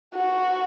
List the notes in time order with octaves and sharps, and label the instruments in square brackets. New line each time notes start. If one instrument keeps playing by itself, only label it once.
[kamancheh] F#4